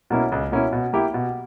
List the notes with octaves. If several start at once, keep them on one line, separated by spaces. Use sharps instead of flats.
B2 A#3 C#4 E4
C#2
B2 A#3 C#4 E4
B2
A#3 E4 G4
B2